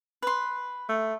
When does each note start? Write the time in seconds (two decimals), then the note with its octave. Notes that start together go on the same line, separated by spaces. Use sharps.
0.22 B4 C6
0.89 A3